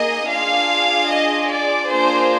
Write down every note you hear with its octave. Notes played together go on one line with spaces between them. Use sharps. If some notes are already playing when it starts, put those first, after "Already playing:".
Already playing: A#3 D#4 G#4 D#5
D4 F4 G#4 F5
D#5
D5
A#3 D4 F4 G#4 C5